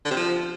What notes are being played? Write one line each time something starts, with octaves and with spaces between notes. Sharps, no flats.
D3
C3
F3